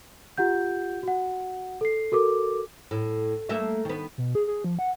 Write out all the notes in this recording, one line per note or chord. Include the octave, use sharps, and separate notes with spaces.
F4 G4 F#5 G6
F#4 F#5
A4 C7
F#4 A4 A#4 D6
A2
A3 A#3 E5
D#3 B3
B2
G#4
G#4
F3
F#5